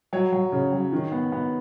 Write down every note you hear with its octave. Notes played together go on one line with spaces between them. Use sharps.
F#3 C#5
F#3
C#3
F#3
D#3
B3
B3